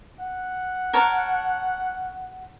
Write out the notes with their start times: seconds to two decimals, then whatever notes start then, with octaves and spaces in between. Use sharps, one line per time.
0.20 F#5
0.93 A#4 C#5 A5